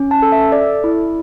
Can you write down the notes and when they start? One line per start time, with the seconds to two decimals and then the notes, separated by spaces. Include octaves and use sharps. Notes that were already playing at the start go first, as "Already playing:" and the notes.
Already playing: C#4
0.11 A5
0.22 A4
0.32 E5
0.52 A4 D5
0.84 E4